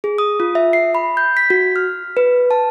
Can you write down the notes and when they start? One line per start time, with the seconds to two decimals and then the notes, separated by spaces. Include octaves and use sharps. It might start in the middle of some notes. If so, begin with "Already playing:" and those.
0.04 G#4
0.18 D#6
0.40 F4
0.55 E5
0.73 C7
0.95 B5
1.17 G6
1.37 B6
1.50 F#4
1.76 F6
2.17 B4
2.51 A5